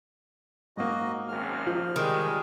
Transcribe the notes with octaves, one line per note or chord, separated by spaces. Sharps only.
G#2 A#3 F#4 D#5
G#1 F#2 F6
F3
D#3 G3 G#3